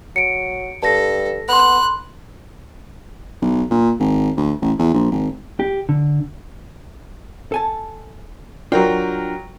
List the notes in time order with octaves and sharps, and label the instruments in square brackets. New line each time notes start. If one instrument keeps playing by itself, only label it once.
[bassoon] F#3 [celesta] C#7 D7
[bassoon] G2 [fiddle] A4 [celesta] A5 A#6
[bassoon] B3 [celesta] B5 C6 [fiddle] F#6
[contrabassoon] B1
A#2
G#1
D2
A1
E2
A#1
G#1
[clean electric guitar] G4
D3
[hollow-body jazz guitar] A4 G#5 A5
[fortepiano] F#3 A#4 G5 [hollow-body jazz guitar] D4 F4